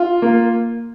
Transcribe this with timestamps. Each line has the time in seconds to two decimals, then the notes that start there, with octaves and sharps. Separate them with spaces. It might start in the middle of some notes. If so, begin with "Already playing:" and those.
Already playing: F4
0.22 A#3